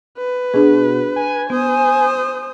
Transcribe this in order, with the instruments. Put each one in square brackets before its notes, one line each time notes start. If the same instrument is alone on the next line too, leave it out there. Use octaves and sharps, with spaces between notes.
[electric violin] B4
[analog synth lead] B2 [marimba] D4 G#4
[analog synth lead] G#5
[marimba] B3 [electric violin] C5 D#6